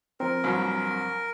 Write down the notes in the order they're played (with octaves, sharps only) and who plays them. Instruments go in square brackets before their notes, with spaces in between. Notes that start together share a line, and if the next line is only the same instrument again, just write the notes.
[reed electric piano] F3 C4 [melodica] A#4
[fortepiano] C2 G2 F#3